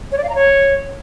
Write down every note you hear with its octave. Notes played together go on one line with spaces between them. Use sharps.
C#5
D5
F5
A#5
C#5